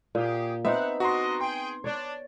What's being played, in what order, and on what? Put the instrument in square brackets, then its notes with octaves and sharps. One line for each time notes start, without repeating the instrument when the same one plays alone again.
[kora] A#2 [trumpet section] G4 G#4
[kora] B3 C4 D#4 [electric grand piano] E5 [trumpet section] F#5
[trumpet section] G3 D4 D#5 [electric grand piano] F#4 A#5 C6
[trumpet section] G#4 G5 [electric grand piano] C6
[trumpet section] D4 [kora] C#5 D5